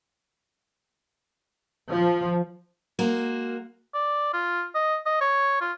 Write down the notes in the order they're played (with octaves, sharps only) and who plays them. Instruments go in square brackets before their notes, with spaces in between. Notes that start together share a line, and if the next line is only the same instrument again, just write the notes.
[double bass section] F3
[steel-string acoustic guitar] G#3 A#3 F#4 A#4
[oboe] D5
F4
D#5
D#5
C#5
F4